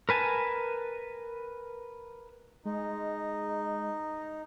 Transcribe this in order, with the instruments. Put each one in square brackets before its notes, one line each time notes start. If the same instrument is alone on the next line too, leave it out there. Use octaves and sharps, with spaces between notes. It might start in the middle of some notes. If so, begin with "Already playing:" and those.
[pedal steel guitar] A#4 B4 G#5 A5
[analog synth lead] G#3 [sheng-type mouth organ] D#4